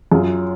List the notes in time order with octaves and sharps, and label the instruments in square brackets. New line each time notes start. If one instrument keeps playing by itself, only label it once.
[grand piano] F#2 F4 G#4